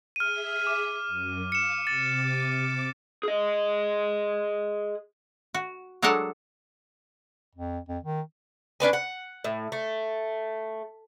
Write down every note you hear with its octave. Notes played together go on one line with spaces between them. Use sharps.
G#4 E5 F6 D#7
D6
F#2
F5 C#7 E7
C3 D6 A6
G#4 D#5
F#4
F#3 G#3 D4 A4 A#4 F#5
F2
F2
D#3
C#4 D4 B4 G#5
F#5
A2
A3